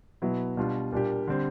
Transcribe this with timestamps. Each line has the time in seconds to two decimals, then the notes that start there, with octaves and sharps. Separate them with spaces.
0.22 B2 F#3 B3 E4
0.57 B2 G3 B3 D4 F4
0.92 A#2 G3 A#3 D4 G4
1.27 D3 G3 C4